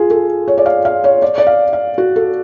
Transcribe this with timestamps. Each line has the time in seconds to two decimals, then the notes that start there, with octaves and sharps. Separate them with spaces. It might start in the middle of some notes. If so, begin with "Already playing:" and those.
Already playing: F4 G#4
0.10 A4
0.48 C#5
0.58 D5
0.66 F5
0.85 F5
1.04 C#5
1.22 D5
1.38 D5
1.47 F5
1.73 F5
1.98 F#4
2.16 A4